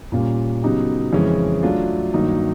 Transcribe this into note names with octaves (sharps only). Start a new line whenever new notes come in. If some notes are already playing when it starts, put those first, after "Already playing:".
A#2 G3 A#3 C#4 F4
C#3 F#3 B3 D#4 G4
F2 C#3 E3 G#3 C#4
F#3 A3 D4 F4
G2 D#3 F#3 A#3 D#4